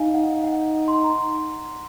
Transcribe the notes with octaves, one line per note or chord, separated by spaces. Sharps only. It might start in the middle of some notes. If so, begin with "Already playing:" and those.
Already playing: D#4 F5 G#5
F#5
F#5
C6
A#5
C6